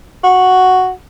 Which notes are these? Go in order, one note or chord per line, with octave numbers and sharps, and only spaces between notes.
F#4